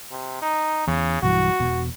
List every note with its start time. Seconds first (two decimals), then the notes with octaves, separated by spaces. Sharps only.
0.11 C3
0.42 D#4
0.88 E2 C#3
1.23 B1 G2 E3 F#4
1.60 E1 B2